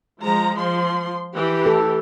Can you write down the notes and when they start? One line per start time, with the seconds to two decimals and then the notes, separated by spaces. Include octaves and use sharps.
0.21 F3 G#3 A#5
0.57 F3 C6
1.36 E3 G4
1.66 A4